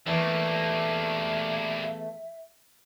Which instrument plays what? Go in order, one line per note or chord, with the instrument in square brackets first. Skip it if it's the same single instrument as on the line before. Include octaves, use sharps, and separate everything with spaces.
[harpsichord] E2 [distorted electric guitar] G3 A#3 [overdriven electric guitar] A3 [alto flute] E5